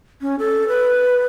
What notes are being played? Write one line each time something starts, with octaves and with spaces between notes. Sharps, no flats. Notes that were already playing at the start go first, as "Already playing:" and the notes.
C#4
A4
B4